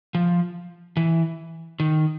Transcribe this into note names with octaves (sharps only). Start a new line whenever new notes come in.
F3
E3
D#3